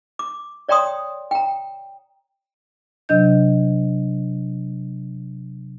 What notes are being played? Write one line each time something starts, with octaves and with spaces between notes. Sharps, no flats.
D6
C#5 D5 G5 A#5 C6 D#6
G5 A#5
C3 F#3 D4 D#5 G6